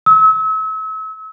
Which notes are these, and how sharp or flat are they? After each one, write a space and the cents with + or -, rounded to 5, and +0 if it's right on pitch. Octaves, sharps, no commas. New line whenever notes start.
E6 -35